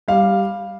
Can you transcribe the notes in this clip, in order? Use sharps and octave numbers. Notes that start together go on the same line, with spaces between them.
G3 F5